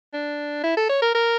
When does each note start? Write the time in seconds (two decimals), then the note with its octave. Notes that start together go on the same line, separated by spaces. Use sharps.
0.14 D4
0.63 E4
0.77 A4
0.89 C#5
1.02 A#4
1.15 A#4